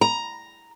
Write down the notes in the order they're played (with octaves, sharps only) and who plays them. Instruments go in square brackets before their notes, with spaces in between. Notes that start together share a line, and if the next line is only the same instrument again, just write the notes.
[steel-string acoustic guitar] A#5